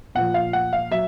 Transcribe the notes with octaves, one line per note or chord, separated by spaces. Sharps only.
A#2 F3 F#5
F5
F#5
F5
F#3 E5